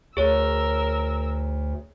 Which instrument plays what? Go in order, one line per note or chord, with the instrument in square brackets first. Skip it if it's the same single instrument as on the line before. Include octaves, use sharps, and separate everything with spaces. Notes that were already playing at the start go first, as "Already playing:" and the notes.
[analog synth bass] D2 [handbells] G#4 C#5 [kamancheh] A#4 E6